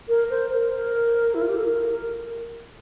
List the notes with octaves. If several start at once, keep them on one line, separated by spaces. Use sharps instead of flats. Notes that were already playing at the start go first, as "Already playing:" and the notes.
A#4
C5
A#4
A#4
E4
F4
G4
A4
A#4